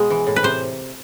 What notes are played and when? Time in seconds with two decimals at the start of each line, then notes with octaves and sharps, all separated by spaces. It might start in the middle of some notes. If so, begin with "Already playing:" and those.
Already playing: B2 G#3 B3
0.10 E3
0.27 A2
0.36 B4
0.43 C3 C5